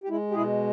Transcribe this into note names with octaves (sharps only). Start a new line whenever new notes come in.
G4
G#3 E4
G4
B2 E4 G#4